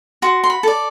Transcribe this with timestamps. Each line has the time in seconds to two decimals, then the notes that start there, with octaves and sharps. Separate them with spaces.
0.22 F#4 C6
0.44 C6
0.50 B5
0.63 A4 D5